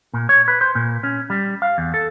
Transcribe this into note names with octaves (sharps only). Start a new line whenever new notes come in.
A#2
C#5
B4
C5
A#2
C#4
G3
F5
E2
A4